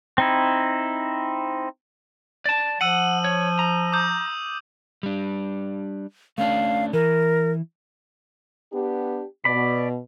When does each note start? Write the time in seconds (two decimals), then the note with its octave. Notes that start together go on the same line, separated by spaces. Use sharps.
0.18 C4 D#4 E4
2.46 D5 A5
2.81 F3 F#5 E6 D#7 F#7
3.24 C#5
3.59 A#5
3.92 D6 D#6 G6
5.03 G3 D4
6.38 A3 C#4 D4 F5
6.93 E3 A#4
8.73 B3 D4 G4
9.45 B2 D5 B5